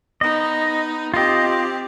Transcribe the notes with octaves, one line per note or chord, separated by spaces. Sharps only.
B3 D#4 D#5
C4 F4 G4 D#5